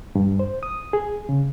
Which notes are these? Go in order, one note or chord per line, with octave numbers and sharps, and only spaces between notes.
G2
C5
D#6
G#4
C#3